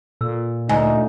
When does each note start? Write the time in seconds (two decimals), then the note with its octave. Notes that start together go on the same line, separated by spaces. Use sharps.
0.21 A#2 A4 E6
0.69 D2 D#4 G#5